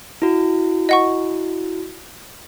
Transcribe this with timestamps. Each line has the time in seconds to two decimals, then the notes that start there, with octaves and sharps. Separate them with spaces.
0.22 E4 F#4
0.89 D#5 F#5 C#6